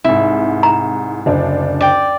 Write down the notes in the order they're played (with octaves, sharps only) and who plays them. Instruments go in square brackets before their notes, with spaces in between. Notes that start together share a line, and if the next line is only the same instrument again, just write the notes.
[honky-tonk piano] C2 G#2 [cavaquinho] E4
[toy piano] A#5
[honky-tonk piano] F#1 D2 D4
[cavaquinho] D5 G5